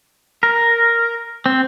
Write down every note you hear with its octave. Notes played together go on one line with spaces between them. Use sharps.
A#4
C4